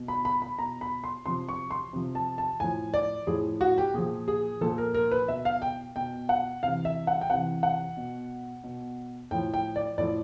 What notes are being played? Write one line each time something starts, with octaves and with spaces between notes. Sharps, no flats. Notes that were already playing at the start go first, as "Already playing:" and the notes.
Already playing: B2
B5
B5
B5
B2 A#5
B5
C6
C3 F3 C6
C#6
C6
C3 F3
A5
A5
A2 F3 G#5
D5
A2 F3 G#4
F#4
G4
A#2 F3 G#4
G#4
A#2 F3 A4
A#4
A#4
B4
B2 E5
F5
G5
B2 G5
F#5
C3 E3 F5
E5
F#5
G5
C3 E3 F#5
F#5
B2
B2
A2 F3 G5
G5
D5
A2 F3 D5